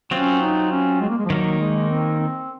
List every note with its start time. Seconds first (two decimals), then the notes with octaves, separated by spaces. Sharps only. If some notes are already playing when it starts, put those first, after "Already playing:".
0.11 F#3 C4 C#4 F4
0.41 D#4
0.71 C#4
1.01 G#3
1.09 A#3
1.18 G#3
1.26 F3
1.30 D#3 F#3 A#3 D#4
1.60 G#3
1.90 C4
2.19 C4